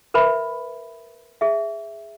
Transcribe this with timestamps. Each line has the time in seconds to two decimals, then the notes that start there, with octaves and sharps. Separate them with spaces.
0.14 A#4 B4 E5 B5
1.41 G#4 E5